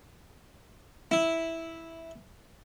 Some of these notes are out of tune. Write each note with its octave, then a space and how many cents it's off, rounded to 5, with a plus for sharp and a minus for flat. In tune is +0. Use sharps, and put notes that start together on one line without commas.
E4 -5